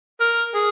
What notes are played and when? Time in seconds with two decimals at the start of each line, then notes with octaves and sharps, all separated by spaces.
0.20 A#4
0.54 G#4